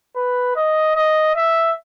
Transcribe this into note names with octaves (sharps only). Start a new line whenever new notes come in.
B4
D#5
D#5
E5